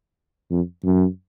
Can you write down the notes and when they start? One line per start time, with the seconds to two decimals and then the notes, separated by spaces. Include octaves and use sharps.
0.51 F2
0.84 F#2